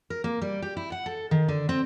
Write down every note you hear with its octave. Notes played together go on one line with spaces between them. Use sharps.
A#4
A#3
G3
G4
E4
F#5
A4
D#3
D3
C4